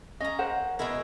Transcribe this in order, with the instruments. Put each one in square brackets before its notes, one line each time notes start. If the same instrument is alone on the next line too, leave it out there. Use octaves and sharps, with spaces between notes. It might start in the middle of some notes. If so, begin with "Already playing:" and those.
[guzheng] C#4 A#5 [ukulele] D#5
[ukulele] A#4 C5 F#5
[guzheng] B2 G#3 E4 [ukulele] A#4